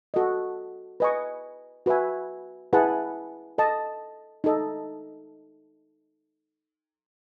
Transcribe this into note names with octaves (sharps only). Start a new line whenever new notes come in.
F#4 A4 D#5
B4 D#5 G#5 C#6
F#4 B4 E5 G#5
E4 G#4 B4 F#5 A5
A4 D#5 A5
D#4 A4 D#5